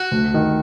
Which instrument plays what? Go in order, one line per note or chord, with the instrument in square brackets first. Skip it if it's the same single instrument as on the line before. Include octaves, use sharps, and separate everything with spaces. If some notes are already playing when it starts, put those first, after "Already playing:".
Already playing: [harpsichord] F#4
[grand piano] D2
D#3